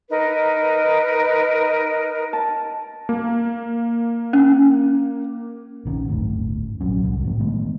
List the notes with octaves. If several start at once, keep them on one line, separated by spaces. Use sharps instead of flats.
D#4 A#4 B4
A5
A#3
C#4
A#1 D#3 C#4
G1 D2 A2
A#1 F#3 C#4
C2
A2 E3 F3 A#3
D#3 G#3 A3 B3